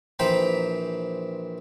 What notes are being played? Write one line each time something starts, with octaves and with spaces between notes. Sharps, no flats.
A#1 E3 C5 G5 A#5 B5